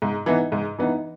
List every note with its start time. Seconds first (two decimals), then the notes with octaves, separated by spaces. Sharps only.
0.02 G#2
0.26 E3 B3 D#4
0.52 G#2
0.79 E3 B3 D#4